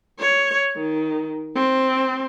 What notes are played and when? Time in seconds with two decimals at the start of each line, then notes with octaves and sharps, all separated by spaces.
0.19 C#5
0.76 D#3
1.55 C4